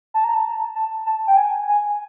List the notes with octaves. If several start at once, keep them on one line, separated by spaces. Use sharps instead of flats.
A5
A#5
A5
A5
A5
G5
G#5
G#5